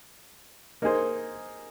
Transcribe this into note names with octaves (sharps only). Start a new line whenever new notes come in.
A#3 D#4 G#4 C5